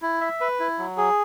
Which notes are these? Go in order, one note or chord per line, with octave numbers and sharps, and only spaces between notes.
E4
E5
B4
E4
F#3
G#4